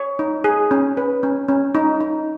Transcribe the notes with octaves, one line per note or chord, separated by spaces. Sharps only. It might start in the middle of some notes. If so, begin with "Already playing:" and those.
Already playing: C#5
D#4
G#4
C#4
B4
C#4
C#4
D#4
D#4